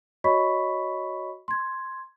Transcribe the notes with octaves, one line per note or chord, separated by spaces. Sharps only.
F#4 C#5 D#5 B5 C#6 B6
C6 G#6